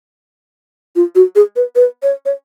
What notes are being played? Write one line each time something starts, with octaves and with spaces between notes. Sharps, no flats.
F4
F#4
G#4
B4
B4
C#5
C#5